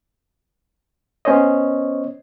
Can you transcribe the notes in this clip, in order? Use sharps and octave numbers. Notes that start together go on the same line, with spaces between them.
B3 C#4 C5 C#5 D#5